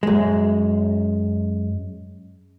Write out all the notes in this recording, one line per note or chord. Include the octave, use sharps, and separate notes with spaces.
F#2 G#3